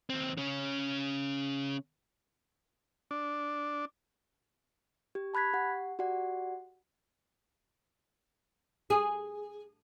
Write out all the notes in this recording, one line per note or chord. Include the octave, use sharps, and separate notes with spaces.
D#2 C4
C#3 C#4
D4
G4
A5 B5 F#6 G#6 B6
G4 F#5
F#4 G4 D5 F#5
G#4